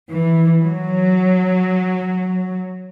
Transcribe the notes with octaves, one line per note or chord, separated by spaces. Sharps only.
E3
F#3